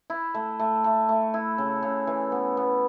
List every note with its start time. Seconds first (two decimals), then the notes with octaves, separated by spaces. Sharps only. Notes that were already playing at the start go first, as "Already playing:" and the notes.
0.10 E4
0.35 A3
0.59 A3
0.84 A3
1.09 A3
1.34 E4
1.58 C#3
1.83 C#3
2.07 E3
2.32 B3
2.57 B3